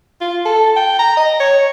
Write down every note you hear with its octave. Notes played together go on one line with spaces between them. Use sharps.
F4
A4
G5
A#5
D#5
C#5